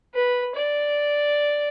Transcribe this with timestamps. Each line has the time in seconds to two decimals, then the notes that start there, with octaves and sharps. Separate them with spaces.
0.15 B4
0.55 D5